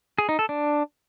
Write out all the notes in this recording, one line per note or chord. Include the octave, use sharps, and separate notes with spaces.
G#4
D#4
A4
D4